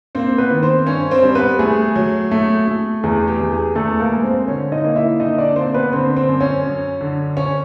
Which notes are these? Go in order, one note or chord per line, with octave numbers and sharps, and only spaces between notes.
A#3 C4 C5
B3 B4
D#3
C4 C5
G2 C#4 C#5
C4 C5
G3
B3 B4
A3 G#4
F#3
A3
A3
E2 G#4
G4
E2
G#4
E2 A3 A4
A#3 A#4
G#3
C4 C5
D3 C#4 C#5
D#4 D#5
A#3
E4 E5
D3 D#4 D#5
D4 D5
A#3 C4 C5
C5
B3 B4
D3 C4 C5
C4 C5
F#2
C#4 C#5
F#2
D3
C#4 C#5